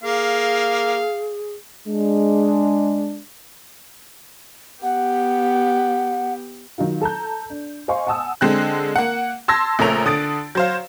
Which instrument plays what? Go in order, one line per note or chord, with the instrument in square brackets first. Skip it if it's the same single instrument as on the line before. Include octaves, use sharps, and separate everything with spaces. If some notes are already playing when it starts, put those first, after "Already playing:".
[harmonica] A#3 [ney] G#4 [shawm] F5
[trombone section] G#3 D4
[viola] B3 G4 [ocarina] F#5
[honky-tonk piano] D#3 F#3 D#4 F4
A4 A5 A#5 G6
D4
C5 D#5 F5 G#5 C6 C#6
F#5 G#5 A5 D#6 E6
D3 G#3 C4 F#6
A#3 F#5
A5 C6 E6 G#6 A#6
A#1 C#3 A3 A#4 F7
D3 D#6 A6 D7
F#3 C5 F5